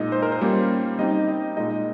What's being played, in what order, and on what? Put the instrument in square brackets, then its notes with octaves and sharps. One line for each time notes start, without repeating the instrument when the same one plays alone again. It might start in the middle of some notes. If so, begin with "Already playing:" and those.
Already playing: [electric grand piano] A#2 G#3 D#4 D#5
C5
A#4
C5
G3 A#3 C#4 F4
G3 C4 D#4 D#5
D#5
A#2 G#3 D#4 D#5